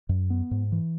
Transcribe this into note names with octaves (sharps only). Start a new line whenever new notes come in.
F#2
B3
G#2
E3